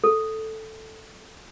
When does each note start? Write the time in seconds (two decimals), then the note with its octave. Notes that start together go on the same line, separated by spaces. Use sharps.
0.04 A4